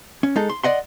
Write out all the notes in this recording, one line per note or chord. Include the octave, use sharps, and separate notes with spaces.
C#4
G#3 D#4 A4
C6
D5 D#5 F#5 C6